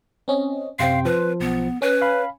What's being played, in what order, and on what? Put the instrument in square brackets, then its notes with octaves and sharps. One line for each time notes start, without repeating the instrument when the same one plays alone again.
[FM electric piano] C4 C#4 D#5
[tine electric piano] F#2 C3 G5 [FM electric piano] C4 C6 [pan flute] F5
[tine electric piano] F3 [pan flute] B4
[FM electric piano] B1 [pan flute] B3
[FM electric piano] C#4 G#5 [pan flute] B4
[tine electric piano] F5 B5